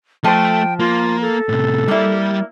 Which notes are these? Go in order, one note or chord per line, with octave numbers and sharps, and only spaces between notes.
F3 A3 C5 G5
A#3 F4
A4
A2 C3
G3 A#3 E4 D5